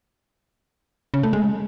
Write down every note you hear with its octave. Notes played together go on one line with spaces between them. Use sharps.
C#3
A3
G#3